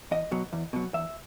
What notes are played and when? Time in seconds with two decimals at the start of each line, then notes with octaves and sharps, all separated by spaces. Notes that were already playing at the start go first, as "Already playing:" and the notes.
0.11 E2 D#5
0.31 B2 F#3
0.53 E2
0.73 B2 F#3
0.94 E2 E5